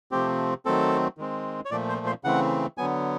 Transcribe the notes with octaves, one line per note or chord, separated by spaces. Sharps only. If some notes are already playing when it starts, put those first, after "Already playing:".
C3 F3 A3 C4 G4
D#3 F#3 A3 C4 A4
D#3 G#3 C4
C#5
A#2 F3 A3 D5
C5
C5
C#3 E3 A3 C4 F#5
D3 F#3 B3 G#5